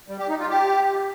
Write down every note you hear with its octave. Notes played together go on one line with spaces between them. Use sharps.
G3
G4
D#4
F4
G4